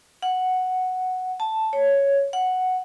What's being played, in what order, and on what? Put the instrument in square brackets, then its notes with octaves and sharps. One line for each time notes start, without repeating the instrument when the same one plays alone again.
[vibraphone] F#5
A5
C#5
F#5